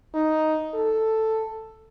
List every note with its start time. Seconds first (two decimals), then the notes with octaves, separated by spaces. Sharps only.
0.14 D#4
0.74 A4